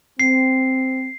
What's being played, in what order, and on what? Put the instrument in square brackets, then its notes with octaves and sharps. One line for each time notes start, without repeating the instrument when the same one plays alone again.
[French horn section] C4 [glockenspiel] C7